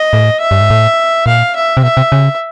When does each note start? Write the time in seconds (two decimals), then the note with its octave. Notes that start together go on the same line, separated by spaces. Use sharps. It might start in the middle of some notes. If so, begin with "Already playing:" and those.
Already playing: D#5
0.13 A2
0.41 E5
0.51 G2
0.61 G#2
0.70 A2
1.26 A#2 F5
1.55 E5
1.77 C3
1.83 B2 E5
1.97 C3
2.12 C#3